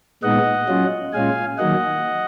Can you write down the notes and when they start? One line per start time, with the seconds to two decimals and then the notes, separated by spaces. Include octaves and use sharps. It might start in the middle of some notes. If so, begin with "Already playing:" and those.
0.23 A#2 G#3 B3 D#4 D#5 F#5
0.69 F#3 C#4 F4
1.13 A#2 G#3 C#4 F4 F5 G#5
1.58 D#3 F#3 A#3 D#4 D#5 F#5